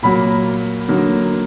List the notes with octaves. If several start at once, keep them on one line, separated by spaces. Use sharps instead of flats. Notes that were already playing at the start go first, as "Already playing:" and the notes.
A#2 F#3 A#3 B5
D3 F#3 A#3 D#4